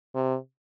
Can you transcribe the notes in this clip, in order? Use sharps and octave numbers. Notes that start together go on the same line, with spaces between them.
C3